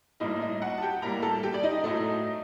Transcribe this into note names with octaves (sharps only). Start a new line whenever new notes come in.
A2 G3 A#3 D#4 D#5
D#4 D#5
F#4 F#5
A5
G4 G5
A2 G3 A#3 A#4 A#5
A4 A5
G4 G5
D5
D#4 D#5
A2 F#3 A3